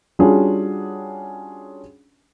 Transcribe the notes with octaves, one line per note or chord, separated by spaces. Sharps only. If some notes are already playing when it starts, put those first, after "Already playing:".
G3 C#4 D4 F4 F#4 G#4